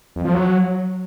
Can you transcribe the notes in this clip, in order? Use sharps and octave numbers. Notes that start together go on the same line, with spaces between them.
F2
F3
F#3